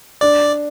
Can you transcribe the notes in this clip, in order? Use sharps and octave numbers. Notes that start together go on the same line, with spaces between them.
D4 D5